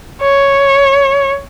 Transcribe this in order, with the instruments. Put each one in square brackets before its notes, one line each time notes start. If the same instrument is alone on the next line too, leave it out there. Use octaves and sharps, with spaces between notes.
[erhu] C#5